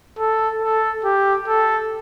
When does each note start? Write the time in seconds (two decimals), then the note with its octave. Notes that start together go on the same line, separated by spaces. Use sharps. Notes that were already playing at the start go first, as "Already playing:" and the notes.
0.19 A4
0.62 A4
1.05 G4
1.48 A4